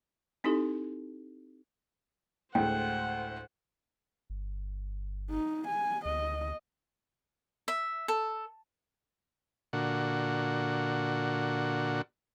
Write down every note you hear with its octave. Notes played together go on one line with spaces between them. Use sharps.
C4 D#4 E4 G4 A4
D2 A2 G#3 C5 F#5 G5
G1
D#4
G#5
D2 D#5
E5
A4
A#2 D3 F#4